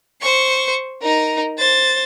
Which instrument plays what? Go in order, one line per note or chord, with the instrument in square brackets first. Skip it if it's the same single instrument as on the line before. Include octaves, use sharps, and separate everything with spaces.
[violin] C5 C#6
D#4 A#4
C5 A6